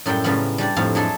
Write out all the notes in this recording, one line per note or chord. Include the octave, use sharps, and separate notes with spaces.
F#2 A2 F#3 G3 G5
A2 C#3 F#3 G3 B3 F4
G3 D4 G4 D5
F2 A2 D#4 F5
F#3 D4 G#4 A4 E5 C6